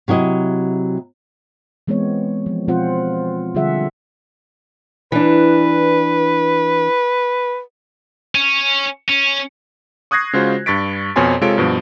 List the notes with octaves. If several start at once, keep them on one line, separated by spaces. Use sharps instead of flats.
C3 F#3 E4 D#5
E3 G#3 B3 C4 C#5
F3
B2 F3 C4 F4 C5 F#5
D3 G3 F4 G#4 E5 F#5
E3 D4 B4
C#4
C#4
C#6 D#6 F#6 G#6 A#6 C7
C#3 G#3 F4 F#4 C5
G2 C#6 A6 B6 D7
F2 B2 F3 C#5 G#5 C6
C3 G#3 F4 A4 C#5 D7
G2 B2 F3